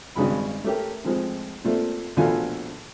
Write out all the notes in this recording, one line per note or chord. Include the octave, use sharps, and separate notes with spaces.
G#1 G2 C#3 G#3 B5
A3 C#4 G4 A#4
A2 F3 G#3 C4
A#2 A3 C4
A#1 B2 D3 A3 F5 G#5